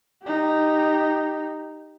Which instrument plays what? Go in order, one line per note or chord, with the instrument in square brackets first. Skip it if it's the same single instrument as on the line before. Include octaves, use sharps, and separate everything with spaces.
[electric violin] D#4 G4